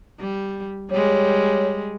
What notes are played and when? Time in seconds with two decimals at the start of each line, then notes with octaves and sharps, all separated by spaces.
0.20 G3
0.91 G3 G#3 C#5